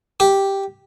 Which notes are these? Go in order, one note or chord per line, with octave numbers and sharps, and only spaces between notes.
G4